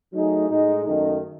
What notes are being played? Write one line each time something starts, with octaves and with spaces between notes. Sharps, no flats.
F#3 A3 D#4 G#4
A2 G#3 D#4
F#2 D#3 A3 D#4